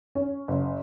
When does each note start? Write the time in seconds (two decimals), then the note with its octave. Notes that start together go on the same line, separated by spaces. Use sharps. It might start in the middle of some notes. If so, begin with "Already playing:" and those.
0.15 C#4
0.48 F#1